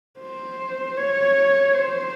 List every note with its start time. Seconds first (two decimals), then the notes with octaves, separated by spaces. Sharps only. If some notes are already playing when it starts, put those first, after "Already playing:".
0.19 C5
0.97 C#5
1.74 C5